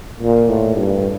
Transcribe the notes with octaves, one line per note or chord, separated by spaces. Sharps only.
A#2
A2
G2